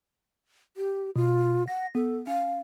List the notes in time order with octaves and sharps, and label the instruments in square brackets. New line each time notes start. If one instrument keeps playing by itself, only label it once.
[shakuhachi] G4
[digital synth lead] B2 [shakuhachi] F4
[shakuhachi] F#5 [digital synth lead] A#6
[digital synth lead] B3 [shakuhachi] A4
[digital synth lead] C#4 [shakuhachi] F5